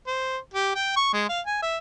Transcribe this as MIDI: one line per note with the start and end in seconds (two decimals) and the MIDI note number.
0.07 0.37 72
0.54 0.71 67
0.75 0.96 79
0.96 1.09 85
1.13 1.25 56
1.29 1.40 77
1.46 1.61 80
1.62 1.77 76